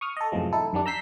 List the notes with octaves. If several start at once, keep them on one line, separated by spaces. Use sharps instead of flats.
C#6 D#6 F6
A4 D#5
F#2 A2 C3 E3 F3 G#3
D#4 E4 A4
F#2 D#3 G3 D4
A#5 E6 G6 B6 C7